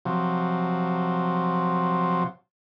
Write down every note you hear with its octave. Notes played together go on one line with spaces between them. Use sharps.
C3 F3 F#3